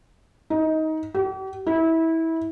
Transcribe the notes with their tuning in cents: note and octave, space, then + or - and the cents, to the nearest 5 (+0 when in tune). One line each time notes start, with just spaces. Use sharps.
D#4 +20
G4 -45
E4 -25